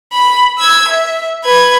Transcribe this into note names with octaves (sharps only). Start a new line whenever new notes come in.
B5
E6 G#6
E5
B4 G#6